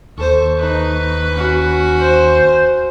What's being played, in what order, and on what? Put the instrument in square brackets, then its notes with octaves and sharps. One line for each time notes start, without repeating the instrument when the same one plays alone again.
[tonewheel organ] D#2 C#6 [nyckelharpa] A4 C5
[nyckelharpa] D#4 [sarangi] B4
[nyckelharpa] C#4 F#4
[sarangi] C5